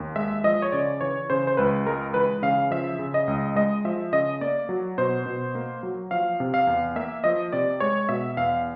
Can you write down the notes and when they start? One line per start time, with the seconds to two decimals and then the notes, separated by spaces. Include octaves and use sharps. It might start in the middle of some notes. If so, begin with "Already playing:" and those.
Already playing: D#2
0.16 G#3 E5
0.44 F3 D#5
0.62 C#5
0.72 C#3 D5
1.01 E3 C#5
1.30 C#3 C5
1.47 C5
1.57 C#2 B4
1.86 G#3 A#4
2.14 E3 B4
2.42 C#3 F5
2.71 F3 E5
2.99 C#3
3.14 D#5
3.28 C#2
3.56 G#3 D#5
3.85 F3 E5
4.12 C#3 D#5
4.41 A#3 D5
4.69 F#3
4.98 B2 C5
5.26 B2
5.55 A#3
5.83 F#3
6.11 F3 F5
6.40 C3
6.54 F5
6.67 E2
6.96 A#3 E5
7.24 F3 D#5
7.53 C3 D5
7.80 G#3 C#5
8.09 B2 E5
8.37 E2 F5